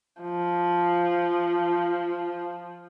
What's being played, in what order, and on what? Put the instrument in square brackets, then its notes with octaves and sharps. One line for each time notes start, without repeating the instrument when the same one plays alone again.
[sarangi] F3